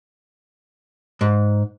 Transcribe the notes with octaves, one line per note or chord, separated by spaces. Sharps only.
G#2